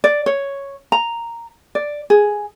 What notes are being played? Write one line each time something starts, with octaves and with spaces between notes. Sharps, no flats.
D5
C#5
A#5
D5
G#4